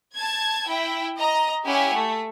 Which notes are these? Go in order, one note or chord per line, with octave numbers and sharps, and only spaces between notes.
A5 G#6
E4 G5
D#5 A#5
C#4 E4 G4 E5 F#5 G#5
A3